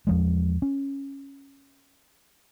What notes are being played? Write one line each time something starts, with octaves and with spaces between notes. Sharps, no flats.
E2 F3 G#3
C#4